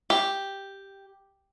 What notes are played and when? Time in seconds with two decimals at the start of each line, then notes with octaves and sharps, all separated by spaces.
0.10 G4